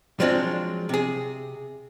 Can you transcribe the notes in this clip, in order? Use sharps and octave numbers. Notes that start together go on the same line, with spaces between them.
F3 F#3 G#3 C4 D4 F4
C3 G#4